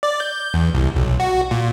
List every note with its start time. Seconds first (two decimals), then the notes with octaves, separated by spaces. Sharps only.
0.03 D5
0.20 G6
0.54 E2
0.74 C2
0.96 B1
1.20 F#4
1.51 A#2